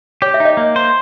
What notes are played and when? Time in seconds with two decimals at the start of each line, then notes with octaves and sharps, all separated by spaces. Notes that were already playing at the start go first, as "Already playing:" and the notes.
0.22 G4 C#5
0.34 E5
0.40 D#4
0.45 D#5
0.57 A#3
0.76 C5